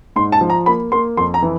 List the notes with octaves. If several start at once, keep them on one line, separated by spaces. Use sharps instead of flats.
G#2 C6
A5
F3
A#5
A#3 B5
A#3 C6
F2 C6
A#5
E3